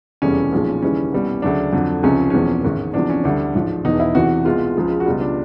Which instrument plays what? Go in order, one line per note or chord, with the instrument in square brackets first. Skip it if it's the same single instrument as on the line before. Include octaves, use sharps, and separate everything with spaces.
[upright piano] F1 E2 C#3 E3 G3 C#4
B1 A#2 F3 G#3
D#2 C#3 E3 G3 C#4
C2 B2 G3
D2 C#3 F#3 D4
F2 D3 F#3
C#2 C3 F3 G#3 C#4
E1 E2 C3 F3 C#4
A1 G#2 D#3
E2 C3 F3 D4
C#4
D2 D3 G3 D4
A1 G#2 F3
E1 E2 B2 D#4
E4
E2 C3 E3 F#4
C2 B2 G#3 F4
C#2 C#3 F3 G#3
F#4
C#2 B2 G3 F4
D4